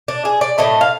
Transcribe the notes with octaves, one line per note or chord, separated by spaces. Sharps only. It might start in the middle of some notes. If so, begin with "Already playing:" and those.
D4
G#4
D5
A2 E3 A3 D#5
F5